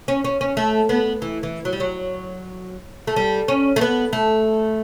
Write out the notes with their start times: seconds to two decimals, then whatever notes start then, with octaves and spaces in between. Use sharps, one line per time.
0.08 C#4
0.24 C#4
0.41 C#4
0.57 A3
0.89 B3
1.22 E3
1.43 E3
1.65 F#3
1.73 G3
1.80 F#3
3.07 A3
3.16 G3
3.48 C#4
3.76 A3
3.81 B3
4.13 A3